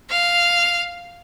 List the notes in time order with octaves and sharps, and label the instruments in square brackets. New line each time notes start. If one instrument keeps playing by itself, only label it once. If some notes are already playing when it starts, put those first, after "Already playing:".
[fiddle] F5